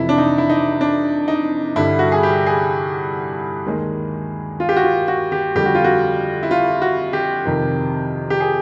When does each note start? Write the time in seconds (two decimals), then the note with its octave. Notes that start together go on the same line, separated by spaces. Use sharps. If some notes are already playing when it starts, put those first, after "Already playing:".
Already playing: F2 C3 E3 E4
0.09 D4
0.18 D#4
0.38 E4
0.50 D#4
0.81 D4
1.28 D#4
1.76 G2 D3 G3 E4
1.99 F#4
2.12 G#4
2.23 G4
2.46 G#4
3.66 D#2 D#3 G#3
4.60 F4
4.69 G4
4.77 F#4
4.84 F4
5.08 F#4
5.32 G4
5.55 F2 D3 G3 G4
5.66 F#4
5.75 F4
5.84 F#4
6.43 E4
6.51 F4
6.82 F#4
7.13 G4
7.45 F2 C3 D#3
8.30 G4
8.40 G#4